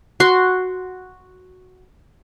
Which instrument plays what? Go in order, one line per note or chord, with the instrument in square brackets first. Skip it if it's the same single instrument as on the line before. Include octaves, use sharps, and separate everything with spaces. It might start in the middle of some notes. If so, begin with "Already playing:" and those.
[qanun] F#4 C6